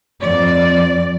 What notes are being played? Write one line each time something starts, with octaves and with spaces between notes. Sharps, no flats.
F2 D5